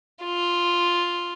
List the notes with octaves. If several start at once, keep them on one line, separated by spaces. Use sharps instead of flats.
F4